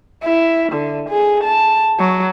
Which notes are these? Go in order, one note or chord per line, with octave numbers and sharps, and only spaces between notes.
E4
D3
G#4
A5
F#3